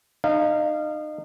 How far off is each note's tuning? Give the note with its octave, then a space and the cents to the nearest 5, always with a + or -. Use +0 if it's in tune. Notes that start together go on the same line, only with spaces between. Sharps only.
D#4 -35 F5 -20